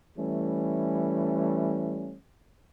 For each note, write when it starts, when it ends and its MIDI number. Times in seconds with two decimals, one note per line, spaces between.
0.17 2.15 52
0.17 2.15 55
0.17 2.15 57
0.17 2.15 61